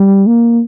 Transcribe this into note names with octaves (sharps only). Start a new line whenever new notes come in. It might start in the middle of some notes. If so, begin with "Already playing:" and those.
Already playing: G3
A#3